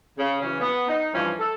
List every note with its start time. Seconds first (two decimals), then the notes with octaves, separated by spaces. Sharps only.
0.18 C#3
0.42 C#3 E3 F#3 C#4
0.61 B3
0.88 D#4
1.14 G2 E3 F3 C#4
1.39 A4